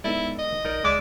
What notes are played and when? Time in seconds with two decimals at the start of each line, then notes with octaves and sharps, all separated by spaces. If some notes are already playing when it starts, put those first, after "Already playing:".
0.04 G#3 B3 D#4 E4 A4 D5
0.39 D#5
0.65 A#1 D#4 A#4 D5
0.85 C#2 G#3 D5 E5 G#5